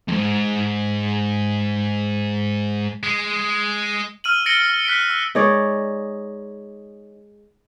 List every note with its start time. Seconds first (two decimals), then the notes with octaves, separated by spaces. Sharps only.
0.08 F2 G#2
3.03 G#3
4.24 E6 F6 D#7 F#7
4.46 A6 A#6 C#7 D7 F#7 G7
4.85 F#6 B6 C#7 D7
5.10 E6
5.35 G#3 D#4 C#5 D5